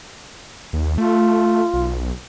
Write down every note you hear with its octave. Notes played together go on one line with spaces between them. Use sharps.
D#2
A3 F4
B1